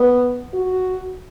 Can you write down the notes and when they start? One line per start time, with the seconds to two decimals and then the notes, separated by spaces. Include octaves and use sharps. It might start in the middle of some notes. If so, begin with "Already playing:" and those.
Already playing: B3
0.54 F#4